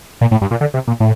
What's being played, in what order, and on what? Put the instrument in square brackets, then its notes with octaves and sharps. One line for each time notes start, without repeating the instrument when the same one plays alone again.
[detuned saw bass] A#2
A2
G2
A#2
D3
C3
A#2
A2